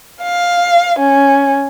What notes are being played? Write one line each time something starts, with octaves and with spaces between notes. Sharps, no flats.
F5
C#4